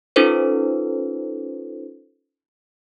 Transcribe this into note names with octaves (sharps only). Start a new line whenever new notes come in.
C#4 D#4 F4 A4 B4 C5